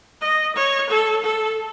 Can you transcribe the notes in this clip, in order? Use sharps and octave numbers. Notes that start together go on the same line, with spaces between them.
D#5
C#5
A4
A4